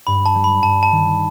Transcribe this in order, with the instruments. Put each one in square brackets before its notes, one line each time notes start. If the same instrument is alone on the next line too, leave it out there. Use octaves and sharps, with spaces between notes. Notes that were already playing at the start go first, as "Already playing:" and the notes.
[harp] G2 [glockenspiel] B5
[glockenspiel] A5
[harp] G3
[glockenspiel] B5
[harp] G2 [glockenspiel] A5
[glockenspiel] A5
[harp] D#3